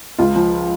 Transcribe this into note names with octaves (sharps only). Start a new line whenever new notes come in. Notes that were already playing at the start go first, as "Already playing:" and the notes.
C#2 F4
F3